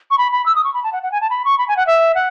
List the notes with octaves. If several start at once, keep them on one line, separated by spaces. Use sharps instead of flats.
C#6
B5
B5
E6
D#6
C#6
B5
A5
F#5
F#5
G#5
A5
B5
C#6
B5
G#5
F#5
E5
F#5